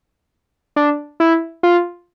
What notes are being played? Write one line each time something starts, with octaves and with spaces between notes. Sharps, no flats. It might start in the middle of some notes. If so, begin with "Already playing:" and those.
D4
E4
F4